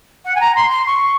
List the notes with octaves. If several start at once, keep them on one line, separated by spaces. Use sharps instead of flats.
F#5
G#5
A#5
C6
C6
C#6